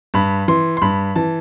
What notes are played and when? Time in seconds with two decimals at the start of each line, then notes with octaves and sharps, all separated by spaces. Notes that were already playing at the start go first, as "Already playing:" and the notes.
0.14 G2 B5
0.48 E3 C6
0.77 C6
0.82 G2 B5
1.15 E3 A5